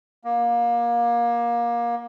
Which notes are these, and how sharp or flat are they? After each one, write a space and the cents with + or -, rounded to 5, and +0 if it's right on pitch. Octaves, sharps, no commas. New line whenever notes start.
A#3 +25